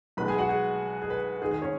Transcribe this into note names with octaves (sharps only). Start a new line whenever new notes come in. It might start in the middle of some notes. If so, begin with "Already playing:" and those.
B1 B2 G#3 B4 B5
G#4 G#5
F#4 F#5
G#4
G#4
B4
G#2 D#3 G#3 G#4
G#4
C#4 C#5